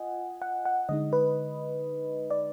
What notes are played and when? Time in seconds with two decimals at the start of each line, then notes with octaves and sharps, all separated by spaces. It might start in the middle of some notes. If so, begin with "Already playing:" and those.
Already playing: F4 D#5 F#5 G#5
0.42 F#5
0.65 F#5
0.89 D3 G#3 D#4 D#5
1.13 B4
2.30 D5